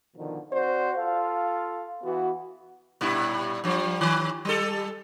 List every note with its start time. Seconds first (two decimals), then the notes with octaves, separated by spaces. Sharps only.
0.16 B2 D3 D#3 F3
0.52 C4 F#4 C5 D5
0.96 F4 A4 F5
2.03 E3 B3 F#4
3.01 G2 A#2 E4
3.64 G2 F3
4.01 D#3
4.45 G3 A4